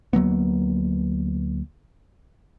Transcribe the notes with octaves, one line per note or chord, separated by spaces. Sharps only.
D2 F#3 A#3 B3